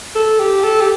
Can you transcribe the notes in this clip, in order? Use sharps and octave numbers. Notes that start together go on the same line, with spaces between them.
A4
G4
A4
G4